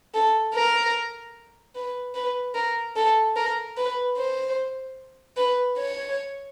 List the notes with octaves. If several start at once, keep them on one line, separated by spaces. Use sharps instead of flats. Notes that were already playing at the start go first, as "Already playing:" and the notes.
A4
A#4
B4
B4
A#4
A4
A#4
B4
C5
B4
C#5